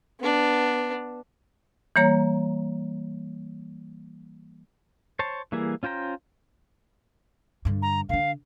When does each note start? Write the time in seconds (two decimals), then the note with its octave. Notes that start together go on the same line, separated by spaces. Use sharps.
0.20 B3 D4
1.96 E3 G3 A#3 C#5 A#5
5.19 C5 C#5 A5
5.52 E3 G3 A#3 E4 G#4
5.83 C#4 F4 C5 G5 A#5
7.65 G2 D3
7.82 A#5
8.09 D3 D4 F5